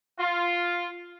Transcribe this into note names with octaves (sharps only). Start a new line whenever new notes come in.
F4